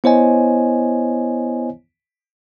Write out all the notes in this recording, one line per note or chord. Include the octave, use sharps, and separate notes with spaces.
B3 E4 C5 C#5 D#5 G#5